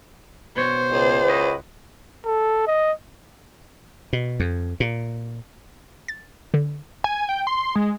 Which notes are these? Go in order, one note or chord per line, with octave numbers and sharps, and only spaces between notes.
B2 C5 C#5
C#2
E4 F#4 D#5
A4
D#5
B2
F2
A#2
A6
D3
G#5
G5
C6
G#3